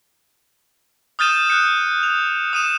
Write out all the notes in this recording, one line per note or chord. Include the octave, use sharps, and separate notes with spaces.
D#6 F6 G6 A6 D#7 E7
F#6 G6 C#7
F7
D#6 D#7 E7